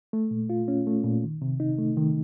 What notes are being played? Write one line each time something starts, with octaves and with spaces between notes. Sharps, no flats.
A3
A#2
F4
C#4
A3
A#2
D#3
C3
D#4
A3
D#3